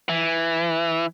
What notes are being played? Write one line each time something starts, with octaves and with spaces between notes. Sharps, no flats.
E3